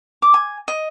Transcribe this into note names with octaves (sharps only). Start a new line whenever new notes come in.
D6
G#5
D#5